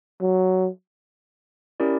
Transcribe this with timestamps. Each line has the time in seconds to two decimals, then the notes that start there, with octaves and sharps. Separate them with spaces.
0.21 F#3
1.80 C#4 E4 G4 A#4 D5